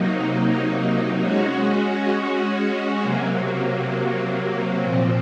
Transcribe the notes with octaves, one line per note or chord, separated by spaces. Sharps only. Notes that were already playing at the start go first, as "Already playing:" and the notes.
Already playing: C3 F#3 A#3 D#4
G#3 C#4 F#4
C3 F#3 A#3
A#2 F3 C4